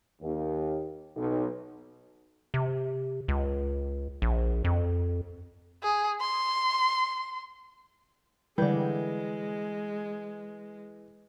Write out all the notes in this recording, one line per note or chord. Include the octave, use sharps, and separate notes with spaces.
D#2
B1
C3
C#2
A#1
F2
G#4
C6
D3 E3 G3 G#3